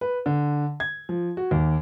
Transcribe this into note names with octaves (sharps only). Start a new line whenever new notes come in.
B4
D3
G#6
F3
F#4
D#2